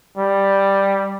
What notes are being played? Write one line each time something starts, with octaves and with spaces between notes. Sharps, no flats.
G3